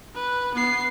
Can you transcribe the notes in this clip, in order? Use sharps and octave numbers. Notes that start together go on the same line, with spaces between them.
B4
B3 C7